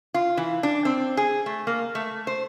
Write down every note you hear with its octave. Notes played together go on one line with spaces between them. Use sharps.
F4
E3
D4
C4
G#4
A3
A#3
A3
C5